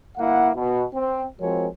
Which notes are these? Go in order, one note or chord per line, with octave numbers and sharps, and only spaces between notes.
G1 A#3 E4 F5 F#5
B2
C4
F3 G#3 C4 F#4 A#4 C#5